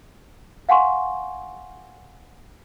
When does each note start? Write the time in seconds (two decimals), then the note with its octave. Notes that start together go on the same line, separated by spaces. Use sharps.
0.69 F5 F#5 G#5 C6 C#6